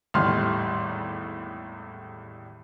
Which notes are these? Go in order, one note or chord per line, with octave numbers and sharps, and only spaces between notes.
G#1 E2 A2 G3 C6 F6